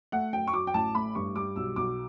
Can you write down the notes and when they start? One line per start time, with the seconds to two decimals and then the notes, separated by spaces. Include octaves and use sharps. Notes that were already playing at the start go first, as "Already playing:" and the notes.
0.12 A3 F#5
0.33 F#2 G5
0.47 C#6
0.53 F#3 D6
0.67 G5
0.74 A1 A5
0.94 A3 B5
1.15 G2 C#6
1.35 G3 D6
1.56 B1 E6
1.76 B1 D6